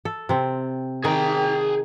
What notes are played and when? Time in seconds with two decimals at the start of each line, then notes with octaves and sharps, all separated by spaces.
0.05 A4
0.29 C3 C4
1.05 D#3 G#4 G5